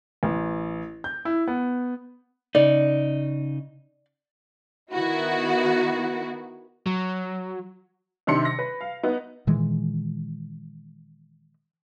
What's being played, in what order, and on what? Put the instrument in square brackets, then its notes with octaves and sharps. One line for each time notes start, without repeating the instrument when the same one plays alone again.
[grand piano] A1
G6
E4
B3
[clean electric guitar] C#3 D#4 [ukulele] D5
[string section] D#3 B3 E4 F#4
[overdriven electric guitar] F#3
[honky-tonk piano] C3 D#3 D4 C6 C#7
A#6
B4
F5
B3 D#4
[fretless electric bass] A#2 D#3 E3 G#3